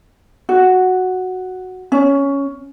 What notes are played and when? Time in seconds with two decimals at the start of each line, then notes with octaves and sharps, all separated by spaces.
0.49 F#4
1.92 C#4